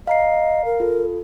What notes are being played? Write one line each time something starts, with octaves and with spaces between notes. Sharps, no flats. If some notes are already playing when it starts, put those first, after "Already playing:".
D#5 F5 A#5 C7
A#4
F4 A4